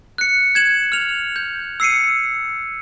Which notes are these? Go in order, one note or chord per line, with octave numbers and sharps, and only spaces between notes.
F#6 C#7
G#6 E7 F#7
F6 F7
G6
E6 C7 C#7 D#7